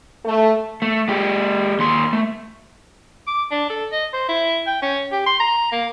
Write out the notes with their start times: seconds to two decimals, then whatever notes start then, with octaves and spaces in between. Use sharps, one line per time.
0.25 A3
0.82 A3
1.08 G#3 G4
1.79 D#2 C6
2.13 A3
3.28 D6
3.51 D4
3.70 A4
3.92 D#5
4.13 C5
4.29 E4
4.67 G5
4.82 C#4
5.12 G4
5.26 C6
5.40 A#5
5.72 A#3